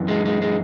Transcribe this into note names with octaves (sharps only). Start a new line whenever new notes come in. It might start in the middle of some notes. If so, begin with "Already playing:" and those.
Already playing: F#2 E3
G#3
G#3
G#3